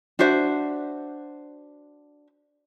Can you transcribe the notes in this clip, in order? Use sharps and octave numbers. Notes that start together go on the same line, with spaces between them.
D4 F#4 C5 E5